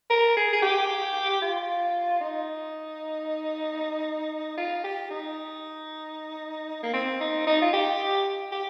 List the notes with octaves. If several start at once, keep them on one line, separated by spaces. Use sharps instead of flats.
A#4
G#4
G#4
G4
F4
D#4
F4
G4
D#4
A#3
C4
D#4
D#4
F4
G4
G4